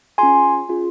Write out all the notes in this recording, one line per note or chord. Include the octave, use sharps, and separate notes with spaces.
C#4 F4 G#4 G#5 C6
C#4 F4 G#4